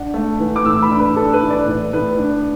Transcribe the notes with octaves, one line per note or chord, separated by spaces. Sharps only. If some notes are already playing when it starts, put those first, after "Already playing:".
Already playing: D4 F#5
A3
E3
D6
A2 E6
B5
D4
B4
D4 A4
B4
E3
D5
A2
A2 B4
D4